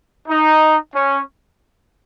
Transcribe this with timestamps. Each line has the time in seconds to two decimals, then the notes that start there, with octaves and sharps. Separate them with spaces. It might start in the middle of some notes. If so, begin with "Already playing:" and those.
0.28 D#4
0.95 C#4